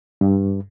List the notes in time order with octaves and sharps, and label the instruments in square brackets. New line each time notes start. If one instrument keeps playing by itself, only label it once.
[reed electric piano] G2